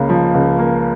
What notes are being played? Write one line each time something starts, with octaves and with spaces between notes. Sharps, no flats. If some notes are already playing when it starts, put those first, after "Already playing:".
Already playing: C#2 C#3 A#3
F3
C#2
A#3